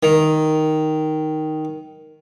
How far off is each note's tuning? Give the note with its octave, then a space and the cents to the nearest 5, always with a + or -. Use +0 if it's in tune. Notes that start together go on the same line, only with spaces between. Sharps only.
D#3 +0